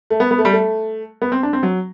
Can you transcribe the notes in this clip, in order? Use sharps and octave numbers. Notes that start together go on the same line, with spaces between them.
A3
B3
B3
A3
G3
A3
B3
C4
D4
C4
F#3